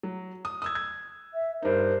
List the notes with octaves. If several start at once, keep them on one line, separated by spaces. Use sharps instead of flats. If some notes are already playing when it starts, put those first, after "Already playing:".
F#3
D#6
D#6 E6 G#6
G#6
E5
G2 D#4 A#4 C5